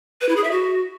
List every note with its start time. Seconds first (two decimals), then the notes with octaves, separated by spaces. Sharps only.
0.21 B4
0.29 E4
0.36 G#4
0.44 E5
0.51 F#4